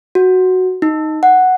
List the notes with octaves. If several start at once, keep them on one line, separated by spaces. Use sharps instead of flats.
F#4
D#4
F#5